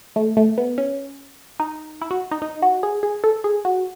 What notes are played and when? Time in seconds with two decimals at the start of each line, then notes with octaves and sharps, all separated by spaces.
0.16 A3
0.37 A3
0.58 B3
0.78 C#4
1.60 D#4
2.01 E4
2.11 F#4
2.31 D#4
2.42 D#4
2.62 F#4
2.83 G#4
3.03 G#4
3.24 A4
3.44 G#4
3.65 F#4